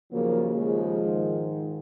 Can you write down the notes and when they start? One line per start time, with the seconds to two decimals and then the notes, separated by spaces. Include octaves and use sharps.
0.11 D#2 C#3 F3 F#3 A#3
0.57 F3 G#3
1.02 G#2 D#3